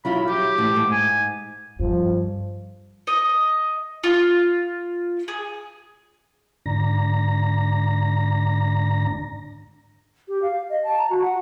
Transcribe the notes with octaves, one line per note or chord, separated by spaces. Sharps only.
F#3 E4 F4 B5
F#3 G4
A2 E3
G#2
G#5
G2 F3
D#5
F4
G#4
G#2 D3 D4 A#5 A#6
G4
F5
D#5
A5
A#5
F#4
F#5